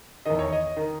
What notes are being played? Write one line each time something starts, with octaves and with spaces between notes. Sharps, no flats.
E2 D#3 D#5
C#5
D#5
D#3